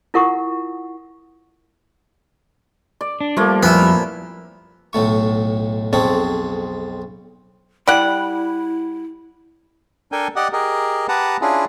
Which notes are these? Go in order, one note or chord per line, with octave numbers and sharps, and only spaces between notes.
E4 F4 A#4 F#5 C#6 D#6
D5
D4
F3 G3 A3 A#3
F2 A#2 B3 E4
B1 A2 A3 C#6
B1 F2 C4 G#4 A4 C#6
G3 E4 F#5
D4 A4 A#4 G5 G#5
G4 D5 D#5 F#5
G4 G#4 A#4 D#5
G4 B4 F#5 A5 A#5
C#4 D4 E4 F4 G#4